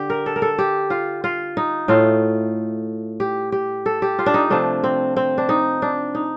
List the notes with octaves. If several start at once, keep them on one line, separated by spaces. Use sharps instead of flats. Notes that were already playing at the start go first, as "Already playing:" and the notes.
Already playing: D3 G4
A#4
A4
A#4
A4
G4
F4
F4
D#4
A2 A3 F4
G4
G4
A4
G4
F4
D4
D#4
C3 F3 A3 D4
C4
C4
D4
D#4
D4
D#4